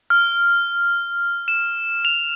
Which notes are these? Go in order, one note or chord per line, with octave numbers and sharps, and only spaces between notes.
F6
E7
F7